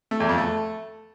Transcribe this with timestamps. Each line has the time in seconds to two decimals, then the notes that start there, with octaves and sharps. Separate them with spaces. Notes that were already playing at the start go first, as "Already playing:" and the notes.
0.11 A3
0.20 E2
0.29 F2
0.38 A3